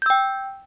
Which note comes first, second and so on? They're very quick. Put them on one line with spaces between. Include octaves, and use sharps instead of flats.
G6 E6 G5